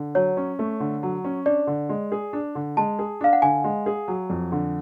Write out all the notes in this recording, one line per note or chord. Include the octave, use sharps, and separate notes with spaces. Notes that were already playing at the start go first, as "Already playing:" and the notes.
Already playing: D3
F#3 C#5
C#4
A3
D3
F#3
C#4
D4 D5
D3
G#3
G#4
D4
D3
G#3 A5
G#4
D4 F5
F#5
D3 G#5
G#3
G#4
F#3
F2
D3